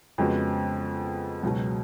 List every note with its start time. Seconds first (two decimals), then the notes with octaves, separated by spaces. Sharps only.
0.18 F2 C#3 G#3 B3 F#4
1.43 C#2 B2 F#3